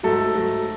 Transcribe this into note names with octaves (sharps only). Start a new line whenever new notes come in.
G#2 F#3 A3 A4
G#2 F#3 A3